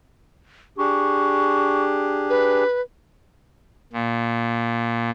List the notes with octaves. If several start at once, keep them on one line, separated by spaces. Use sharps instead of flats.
D4 G4 G#4 C#6
B4
A#2